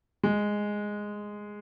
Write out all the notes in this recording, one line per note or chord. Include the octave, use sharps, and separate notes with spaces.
G#3